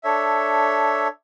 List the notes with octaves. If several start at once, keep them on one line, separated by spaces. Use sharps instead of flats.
D4 A4 C#5 E5